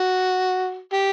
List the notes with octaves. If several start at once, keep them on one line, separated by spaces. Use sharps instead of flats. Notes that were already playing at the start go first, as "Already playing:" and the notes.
Already playing: F#4
G4